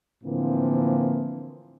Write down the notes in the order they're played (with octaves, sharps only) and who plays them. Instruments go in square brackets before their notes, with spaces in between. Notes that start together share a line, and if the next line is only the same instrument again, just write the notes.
[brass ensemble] A2 D3 E3 F3 A#3 C4